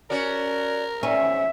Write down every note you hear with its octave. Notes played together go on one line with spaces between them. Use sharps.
C#4 F#4 A#4 D5
G#2 C#4 E5